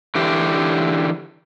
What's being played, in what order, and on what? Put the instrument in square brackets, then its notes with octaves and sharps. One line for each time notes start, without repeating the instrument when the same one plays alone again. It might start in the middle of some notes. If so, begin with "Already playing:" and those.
[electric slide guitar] D3 E3 G4